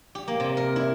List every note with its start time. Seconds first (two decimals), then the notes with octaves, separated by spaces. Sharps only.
0.15 G4
0.28 A#3
0.40 C3
0.57 A#4
0.76 E4